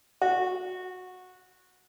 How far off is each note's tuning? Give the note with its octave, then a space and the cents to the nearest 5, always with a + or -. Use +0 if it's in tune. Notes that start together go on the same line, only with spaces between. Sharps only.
F#4 -15